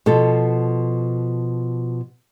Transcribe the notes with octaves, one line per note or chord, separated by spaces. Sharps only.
B2 F3 A4